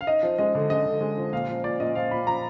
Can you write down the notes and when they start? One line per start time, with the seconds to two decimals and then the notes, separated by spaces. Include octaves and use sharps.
0.01 F5
0.07 D#4 D#5
0.23 F3
0.38 G#3 D#5
0.55 D3
0.70 G#3 D#5
0.86 D3
1.01 G#3
1.17 F3
1.33 A#2 F5
1.48 F3
1.64 A#2 D5
1.80 A#2 D#5
1.95 F3 F5
2.11 A#2 B5
2.27 F3 A#5